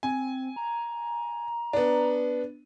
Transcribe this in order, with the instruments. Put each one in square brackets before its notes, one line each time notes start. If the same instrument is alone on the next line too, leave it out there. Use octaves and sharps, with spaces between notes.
[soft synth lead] C4 [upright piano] G#5
[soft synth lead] A#5
[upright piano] B3 D4